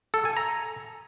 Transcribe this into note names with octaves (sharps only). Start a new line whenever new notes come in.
A4
G#5
A#5